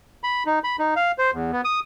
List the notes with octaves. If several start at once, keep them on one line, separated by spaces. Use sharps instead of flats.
B5
D#4
B5
D#4
F5
C5
E2
B3
D#6